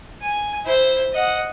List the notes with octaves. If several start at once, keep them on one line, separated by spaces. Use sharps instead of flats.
G#5
E4 C5
D#5 F#5